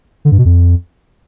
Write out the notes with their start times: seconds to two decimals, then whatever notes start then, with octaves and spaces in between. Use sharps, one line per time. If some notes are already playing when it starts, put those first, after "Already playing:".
0.25 D3
0.32 G2
0.38 B2
0.45 F2